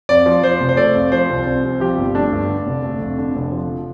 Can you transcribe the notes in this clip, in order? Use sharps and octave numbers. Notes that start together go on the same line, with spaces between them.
F2 D5
F3
F3 C5
F1
C5
A3 D5
F2
F3 C5
C2
C2
C3
F3 G4
G1
A3 D4
G2
D3
F1
A3
F2
D3
F1
F3